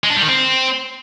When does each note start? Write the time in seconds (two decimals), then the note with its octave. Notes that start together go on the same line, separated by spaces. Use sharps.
0.04 G#3
0.10 D4
0.16 G3
0.22 D#3
0.28 C4